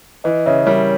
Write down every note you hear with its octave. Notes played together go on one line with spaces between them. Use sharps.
E3 B4 D#5
C#3 C#5 E5
G3 A#4 C#5